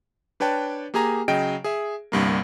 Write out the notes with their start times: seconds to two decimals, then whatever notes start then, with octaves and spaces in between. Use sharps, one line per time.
0.40 D4 B4 C#5 G5 A5
0.94 A#3 G4 G#4 G#5 A#5
1.28 C#3 F#3 D#5 G5 D7
1.64 G#4 E5
2.12 G1 C2 G2 A#3